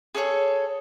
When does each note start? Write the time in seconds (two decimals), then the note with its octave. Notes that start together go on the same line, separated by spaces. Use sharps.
0.15 G#4 A4 C5 C#5